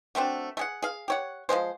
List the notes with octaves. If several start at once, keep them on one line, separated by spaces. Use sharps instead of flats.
F#3 A3 C4 D4
A3 G#4 F#5
G#4 F5
G4 C#5 F#5
F3 G3 G#3 C5